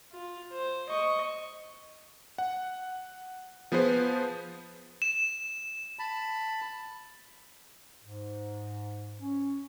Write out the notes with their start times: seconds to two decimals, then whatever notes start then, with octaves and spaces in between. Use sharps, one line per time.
0.12 F4
0.52 C5
0.89 D#5 C#6
2.38 F#5
3.72 F3 B3 G#4 B4 C5
5.02 E7
5.99 A5 B5
8.03 G#2
9.20 C#4